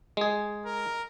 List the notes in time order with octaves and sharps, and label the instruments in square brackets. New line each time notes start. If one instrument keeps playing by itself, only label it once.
[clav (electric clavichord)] G#3 G#4
[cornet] A#4